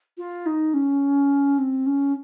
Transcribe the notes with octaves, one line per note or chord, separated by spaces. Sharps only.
F4
D#4
C#4
C4
C#4